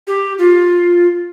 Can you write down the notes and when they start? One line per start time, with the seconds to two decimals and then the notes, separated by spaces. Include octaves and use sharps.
0.07 G4
0.38 F4